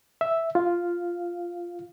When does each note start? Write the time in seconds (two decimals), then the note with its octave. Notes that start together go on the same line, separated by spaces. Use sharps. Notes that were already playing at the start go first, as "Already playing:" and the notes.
0.21 E5
0.55 F4 F5